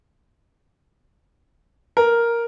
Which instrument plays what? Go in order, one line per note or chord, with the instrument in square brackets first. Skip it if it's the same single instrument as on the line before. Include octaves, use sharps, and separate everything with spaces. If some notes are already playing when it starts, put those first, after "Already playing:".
[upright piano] A#4